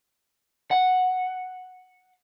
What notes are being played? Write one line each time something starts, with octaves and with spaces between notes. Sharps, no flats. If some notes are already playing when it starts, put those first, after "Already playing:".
F#5